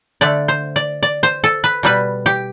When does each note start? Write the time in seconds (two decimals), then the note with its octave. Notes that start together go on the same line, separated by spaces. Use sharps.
0.21 D3 A3 D5
0.48 C5
0.76 D5
1.03 D5
1.23 C5
1.44 A4
1.64 B4
1.83 B2 G3 B4
2.26 G4